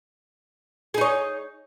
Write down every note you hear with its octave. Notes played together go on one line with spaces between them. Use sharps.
D#4 G#4 C#5